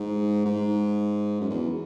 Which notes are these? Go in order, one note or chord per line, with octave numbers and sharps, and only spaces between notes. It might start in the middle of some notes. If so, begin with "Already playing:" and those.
Already playing: G#2
G#2
F#2
E2